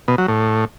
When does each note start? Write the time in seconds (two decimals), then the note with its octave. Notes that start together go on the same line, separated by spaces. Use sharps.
0.08 B2
0.18 F#3
0.28 A2